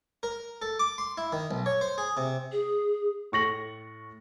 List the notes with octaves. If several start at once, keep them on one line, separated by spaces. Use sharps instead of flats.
A#4
A4
D6
C6
E4
D#3
B1
C#5
C5
G#4
C3
G#4
A2 C#6 A#6 F#7